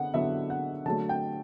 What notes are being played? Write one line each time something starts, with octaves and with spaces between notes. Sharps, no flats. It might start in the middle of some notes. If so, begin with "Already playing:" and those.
Already playing: D3 B3 F#5
D3 F#3 B3 E4 E5
F#5
D3 F#3 A3 A5
G5